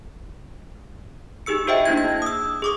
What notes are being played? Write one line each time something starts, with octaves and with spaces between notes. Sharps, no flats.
D#4 G4 G#4 E6 C#7
F#4 G#4 C5 D#5 E5 G5
A#3 D4 E4 G#6
G#6
D#6 E6
G#4 D6 D#6